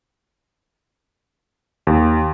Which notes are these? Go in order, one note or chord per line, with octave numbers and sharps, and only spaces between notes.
D#2